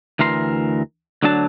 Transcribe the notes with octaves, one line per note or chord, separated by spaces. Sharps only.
D2 E3 A#4 C6
D2 D3 F#3 D4 A5